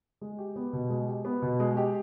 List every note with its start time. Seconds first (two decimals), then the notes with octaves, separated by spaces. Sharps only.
0.21 G#3
0.38 G4
0.56 B3
0.73 B2
0.90 G#3
1.07 G4
1.25 B3
1.42 B2
1.60 G#3
1.77 G4